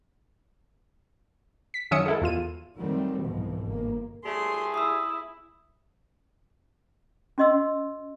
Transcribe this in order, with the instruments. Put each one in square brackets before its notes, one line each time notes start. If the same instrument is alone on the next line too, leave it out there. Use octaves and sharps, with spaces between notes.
[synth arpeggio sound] B6
F#2 D#3 C#4 E5 D#6 C#7
G#3 E4 A4
E2 F4 D#7
[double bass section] D#3 F#3 G3 A3 C4
C2 G#2 B2 E3 F3
G1 A#3
[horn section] A2 G3 A3 [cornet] G#4 [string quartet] C6
[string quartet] E4 [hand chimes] D#6 E6
[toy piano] C#4 F#4 D#5 C6 E6